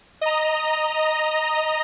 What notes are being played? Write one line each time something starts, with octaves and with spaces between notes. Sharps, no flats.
D#5 A#5